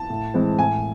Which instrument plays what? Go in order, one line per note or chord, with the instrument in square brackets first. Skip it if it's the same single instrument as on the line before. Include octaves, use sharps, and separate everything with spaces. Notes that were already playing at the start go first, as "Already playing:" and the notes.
Already playing: [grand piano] A5
A2
E3 G#3 C4
A2 G#5